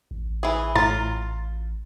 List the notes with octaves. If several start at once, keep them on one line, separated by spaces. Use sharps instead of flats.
A1
E3 G#4
A2 F4 A#5 A6